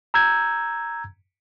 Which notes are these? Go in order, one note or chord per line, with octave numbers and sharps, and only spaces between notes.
A#5 E6 G6 G#6